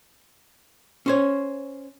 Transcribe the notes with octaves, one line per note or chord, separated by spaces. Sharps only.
C#4 C5 C#5